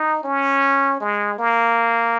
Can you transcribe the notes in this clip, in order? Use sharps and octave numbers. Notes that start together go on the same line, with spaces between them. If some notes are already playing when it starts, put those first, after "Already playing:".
Already playing: D#4
C#4
G#3
A#3